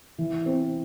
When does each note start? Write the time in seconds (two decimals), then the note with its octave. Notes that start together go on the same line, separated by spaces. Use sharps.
0.18 E3
0.46 C4